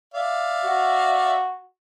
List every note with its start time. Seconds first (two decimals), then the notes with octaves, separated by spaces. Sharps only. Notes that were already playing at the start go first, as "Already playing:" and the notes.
0.14 D5 E5 F5
0.65 F#4